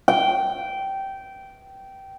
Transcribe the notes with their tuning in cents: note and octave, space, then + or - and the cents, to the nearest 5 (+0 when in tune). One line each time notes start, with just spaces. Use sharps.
G5 -15